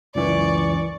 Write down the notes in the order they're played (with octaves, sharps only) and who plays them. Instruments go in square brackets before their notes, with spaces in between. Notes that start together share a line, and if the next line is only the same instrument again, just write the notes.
[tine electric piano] C#2 F#2 E3 [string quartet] D5 C#6